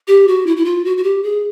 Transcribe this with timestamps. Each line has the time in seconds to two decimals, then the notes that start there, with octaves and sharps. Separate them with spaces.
0.08 G4
0.28 F#4
0.47 E4
0.57 E4
0.65 F4
0.85 F#4
0.97 F#4
1.03 G4
1.23 G#4